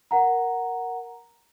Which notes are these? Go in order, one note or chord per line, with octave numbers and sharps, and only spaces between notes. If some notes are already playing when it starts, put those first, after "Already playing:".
A#4 F#5 A#5